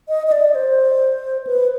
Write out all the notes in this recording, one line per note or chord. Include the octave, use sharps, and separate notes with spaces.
D#5
D#5
D5
C5
B4